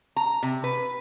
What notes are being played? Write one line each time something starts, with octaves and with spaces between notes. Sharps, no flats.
A#5
C3
B4